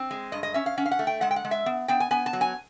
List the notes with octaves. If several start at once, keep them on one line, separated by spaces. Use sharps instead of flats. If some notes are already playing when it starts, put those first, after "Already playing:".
Already playing: C4
G#3
G2 D#5
D#5
C#4 E5
F5
C#4 F#5
F5
F#5
A3
G5
G#3 F#5
G5
F#5
G#3
E5
B3
B3 G5
G#5
B3 G#5
A5
F#3
G#5